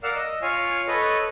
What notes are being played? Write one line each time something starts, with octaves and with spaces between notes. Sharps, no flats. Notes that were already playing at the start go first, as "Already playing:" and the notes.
A#4 D5 F5 F#5 E6 F6
D#5 E6
F4 C#5 F5 G#5
A4 B4 C#5 D#5